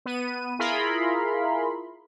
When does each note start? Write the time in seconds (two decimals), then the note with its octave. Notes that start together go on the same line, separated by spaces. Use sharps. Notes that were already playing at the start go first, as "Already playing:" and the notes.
0.06 B3 D#7
0.59 E4 F4 G#4 A#4 B5 C6